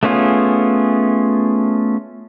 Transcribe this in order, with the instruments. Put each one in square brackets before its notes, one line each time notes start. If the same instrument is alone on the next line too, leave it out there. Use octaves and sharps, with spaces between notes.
[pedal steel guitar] A3 B3 C#4 F4 G#4